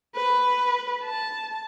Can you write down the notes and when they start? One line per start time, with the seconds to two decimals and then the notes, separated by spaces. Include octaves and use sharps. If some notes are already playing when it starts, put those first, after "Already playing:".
0.15 B4
1.04 A5